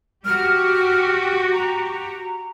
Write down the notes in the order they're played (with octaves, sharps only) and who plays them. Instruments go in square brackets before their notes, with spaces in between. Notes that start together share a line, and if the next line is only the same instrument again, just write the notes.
[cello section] F#4 G4 [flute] F6
[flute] A#5